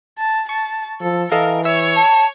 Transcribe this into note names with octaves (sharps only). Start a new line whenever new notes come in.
A5
A5 C#6
F3 A4
E3 A4 A#4 D#5 F5
C#5 E5 E6
A5